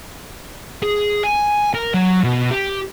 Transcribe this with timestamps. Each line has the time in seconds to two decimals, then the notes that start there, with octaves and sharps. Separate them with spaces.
0.83 G#4
1.24 G#5
1.74 A#4
1.94 F#3
2.24 B2
2.50 G4